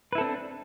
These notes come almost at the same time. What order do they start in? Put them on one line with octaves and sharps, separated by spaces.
B4 E4 A4 C4 D4